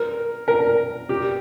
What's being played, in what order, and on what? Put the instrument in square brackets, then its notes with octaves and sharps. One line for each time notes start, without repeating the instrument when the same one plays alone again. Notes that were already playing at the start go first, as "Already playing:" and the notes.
Already playing: [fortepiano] A#4
A#4
G4